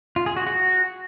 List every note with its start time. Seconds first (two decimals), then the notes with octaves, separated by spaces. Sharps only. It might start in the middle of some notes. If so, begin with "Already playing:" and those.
0.16 F4
0.26 G#4
0.36 F#4
0.47 F#4